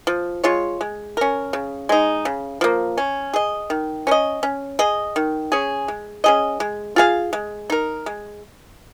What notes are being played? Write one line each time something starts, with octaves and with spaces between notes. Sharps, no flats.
F3
G#3 F4 C#5
G#3
C#4 A#4
C#3
G#3 D#4
C#3
F3 A#3
C#4
G#4 D#5
D#3
C#4 A#4 D#5
C#4
G#4 D#5
D#3
C#4 G#4
G#3
C#4 G#4 D#5
G#3
F4 G#4 F5
G#3
D#4 A#4
G#3